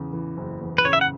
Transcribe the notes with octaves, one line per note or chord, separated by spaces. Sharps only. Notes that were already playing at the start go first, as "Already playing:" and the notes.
Already playing: E2 C#3
E3
F#1
E2
B4
C#3 C#5
E5
F#5